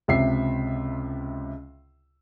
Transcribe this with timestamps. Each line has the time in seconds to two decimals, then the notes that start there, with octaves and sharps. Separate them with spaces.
0.08 C#2 C3 E5 C7